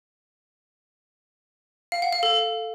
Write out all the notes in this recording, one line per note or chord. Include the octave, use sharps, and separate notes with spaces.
F5
F#5
F5
A4